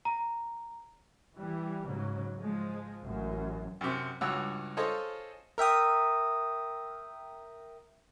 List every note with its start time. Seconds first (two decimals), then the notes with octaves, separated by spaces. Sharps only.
0.05 A#5
1.36 E3 G3
1.87 G#2 C#3 F#3
2.37 F3 G#3
3.02 A1 F#2
3.81 F#2 C3
4.21 C#2 G2 F#4 C#5 E6
4.77 F4 G#4 A4 C5 C#5 D#5
5.58 A#4 E5 G5 D#6